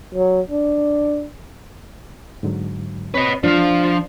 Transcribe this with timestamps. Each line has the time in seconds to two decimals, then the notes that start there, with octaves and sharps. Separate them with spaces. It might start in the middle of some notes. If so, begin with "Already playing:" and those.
0.15 F#3
0.50 D4
2.43 G#2 D3 F#3
3.14 C4 B4 C#5 D#5
3.43 F3 D4 F4 F5